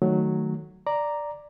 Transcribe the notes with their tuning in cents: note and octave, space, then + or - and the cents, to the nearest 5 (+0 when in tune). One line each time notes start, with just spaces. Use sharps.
D#3 +0 F#3 -5 A3 +0
D5 +0 A#5 +0